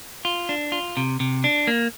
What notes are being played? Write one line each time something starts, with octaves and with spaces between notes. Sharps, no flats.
F4
D4
F4
C3
C3
D4
A#3